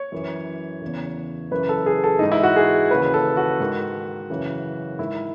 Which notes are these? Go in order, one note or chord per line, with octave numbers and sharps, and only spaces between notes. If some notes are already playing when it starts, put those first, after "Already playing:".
Already playing: C#5
F#2 E3
E2 C#3 E3
F#2 C#3 E3 B4
A4
G#4
A4
G#2 E3 D#4
E4
F#4
G#4
D#2 C#3 E3 B4
A4
F#4
G#2 D#3
F#2 C#3 E3
G#2 D#3 E4